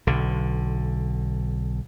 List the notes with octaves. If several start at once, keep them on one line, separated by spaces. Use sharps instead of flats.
B1 D3